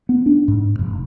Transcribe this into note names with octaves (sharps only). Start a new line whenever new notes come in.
B3
D4
G#2
F1